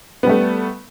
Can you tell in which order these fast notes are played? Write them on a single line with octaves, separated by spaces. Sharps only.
B3 G3 A3